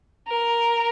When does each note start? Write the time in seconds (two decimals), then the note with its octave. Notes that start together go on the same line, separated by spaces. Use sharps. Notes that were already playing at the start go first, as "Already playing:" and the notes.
0.28 A#4